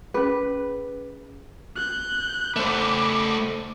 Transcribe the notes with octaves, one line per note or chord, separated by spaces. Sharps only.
C#4 G#4 B4
F#6 G6
A3 C5 B5 D6